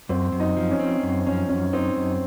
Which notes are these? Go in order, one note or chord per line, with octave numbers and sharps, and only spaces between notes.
F#2 C4
F#2
D#4
F3
C#4
C4
F#2
F3 C#4
F#2 C#4
C4 D#4
F#2